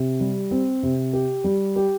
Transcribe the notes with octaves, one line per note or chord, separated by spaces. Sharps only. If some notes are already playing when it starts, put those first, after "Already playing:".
Already playing: C3
G3
C4
C3
G4
G3
G4